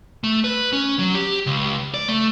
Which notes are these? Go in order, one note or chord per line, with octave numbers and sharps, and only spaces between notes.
A3
B4
C#4
F#3
G4
C#2
D5
A3